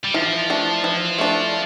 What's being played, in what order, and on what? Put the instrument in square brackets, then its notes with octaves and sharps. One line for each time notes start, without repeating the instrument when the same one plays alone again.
[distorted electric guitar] G3
[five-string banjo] E3 [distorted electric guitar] F3
[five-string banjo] A3 D4
E3
A3 D4